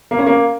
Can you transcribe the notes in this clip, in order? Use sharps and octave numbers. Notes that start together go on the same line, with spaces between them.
A#3
C#4
A#3